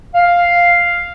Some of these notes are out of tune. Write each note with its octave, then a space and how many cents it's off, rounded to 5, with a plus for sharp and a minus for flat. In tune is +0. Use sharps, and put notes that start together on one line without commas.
F5 +0